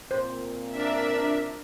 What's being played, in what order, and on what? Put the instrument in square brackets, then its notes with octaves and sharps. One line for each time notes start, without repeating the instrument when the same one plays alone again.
[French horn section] A#2 A#3 C4 [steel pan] C5
[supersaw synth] D4 A#4 D5 [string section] E5